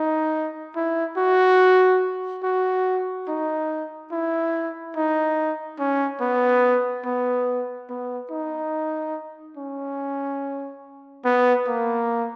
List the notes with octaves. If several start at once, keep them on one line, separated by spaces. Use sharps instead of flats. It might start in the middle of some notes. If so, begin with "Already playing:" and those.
Already playing: D#4
E4
F#4
F#4
D#4
E4
D#4
C#4
B3
B3
B3
D#4
C#4
B3
A#3